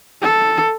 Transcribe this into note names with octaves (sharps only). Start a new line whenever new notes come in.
A4